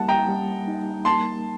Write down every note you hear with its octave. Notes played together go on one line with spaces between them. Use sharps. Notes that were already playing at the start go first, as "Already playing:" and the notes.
Already playing: G3 A#3 F#5 A5
G5 A#5
G3
D#4
A#3 A5 C6